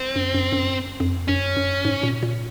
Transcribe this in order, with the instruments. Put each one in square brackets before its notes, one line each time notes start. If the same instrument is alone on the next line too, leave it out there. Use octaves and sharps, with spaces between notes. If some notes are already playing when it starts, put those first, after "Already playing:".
Already playing: [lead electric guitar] C4
[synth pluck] F#2
F#2
F#2
F2
[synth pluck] F#2 [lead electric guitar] C#4
[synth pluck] F#2
G#2
A#2
A#2